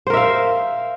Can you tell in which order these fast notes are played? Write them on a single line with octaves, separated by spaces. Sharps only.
C5 A#4 E5 F5